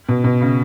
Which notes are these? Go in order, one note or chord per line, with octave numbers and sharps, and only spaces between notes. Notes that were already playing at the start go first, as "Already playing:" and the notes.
B2
B2
C#3